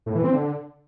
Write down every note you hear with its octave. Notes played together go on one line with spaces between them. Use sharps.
A2
E3
C4
D3